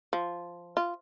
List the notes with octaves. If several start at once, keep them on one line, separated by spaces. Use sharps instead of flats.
F3
F4